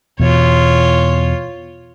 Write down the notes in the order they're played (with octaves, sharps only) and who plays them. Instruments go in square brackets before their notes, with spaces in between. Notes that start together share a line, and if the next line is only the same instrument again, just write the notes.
[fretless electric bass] E2 B2 [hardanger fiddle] F4 C#5